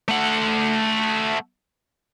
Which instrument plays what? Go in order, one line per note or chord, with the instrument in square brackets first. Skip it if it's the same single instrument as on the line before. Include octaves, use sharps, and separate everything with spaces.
[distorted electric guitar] A3 F#5